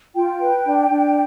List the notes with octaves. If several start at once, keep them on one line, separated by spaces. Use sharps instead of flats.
F4 G5
B4
D4
D4